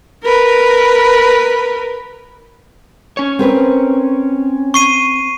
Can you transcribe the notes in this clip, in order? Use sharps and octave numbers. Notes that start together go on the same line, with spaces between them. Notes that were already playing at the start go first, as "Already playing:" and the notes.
A#4 B4
C#4 C#5
C4 A#4 B4
C#6 C7 D#7